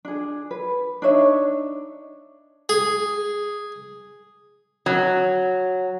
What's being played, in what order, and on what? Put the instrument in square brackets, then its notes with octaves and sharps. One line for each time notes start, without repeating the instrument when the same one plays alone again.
[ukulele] D4 G#4
B4
D4 D#4 C#5 E5
[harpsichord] G#4
[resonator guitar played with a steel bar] F#3